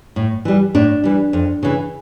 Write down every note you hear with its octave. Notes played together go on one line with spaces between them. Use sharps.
A2
E3 G3
A2 D4
E3 G3
F2
C#3 E3